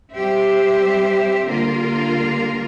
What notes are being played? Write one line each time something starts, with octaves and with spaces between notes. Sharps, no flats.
G3 C4 G4 C5 E5
D3 G3 A#3 F4 A#4